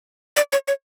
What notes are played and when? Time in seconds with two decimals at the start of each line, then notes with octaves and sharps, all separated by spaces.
0.36 D5
0.52 C#5
0.68 C#5